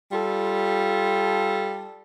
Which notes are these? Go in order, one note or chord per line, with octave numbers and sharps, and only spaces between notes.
G3 F4 A4